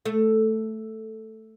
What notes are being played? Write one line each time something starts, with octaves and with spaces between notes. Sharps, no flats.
A3